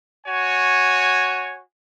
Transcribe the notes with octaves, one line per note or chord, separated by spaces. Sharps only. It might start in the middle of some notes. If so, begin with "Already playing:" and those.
F#4 C#5 G#5